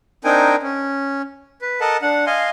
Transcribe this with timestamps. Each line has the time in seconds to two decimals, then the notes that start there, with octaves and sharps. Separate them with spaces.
0.24 C4 D4 D#4 A#4 G5 G#5
0.63 C#4
1.62 B4
1.81 A4 A#4 D#5 F#5 A5
2.02 D4 F#5
2.26 D#5 F5 G#5 C6